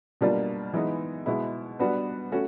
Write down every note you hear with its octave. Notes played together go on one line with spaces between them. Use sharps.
B2 G3 A#3 D4 F4
E3 G#3 B3 D#4
B2 G#3 B3 E4
G3 B3 D4 F#4 B4
A3 C#4 F#4